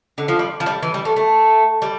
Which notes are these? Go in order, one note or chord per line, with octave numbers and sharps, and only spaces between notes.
D3
F3
G3
F3
G3
E3
G3
A3
A3
G3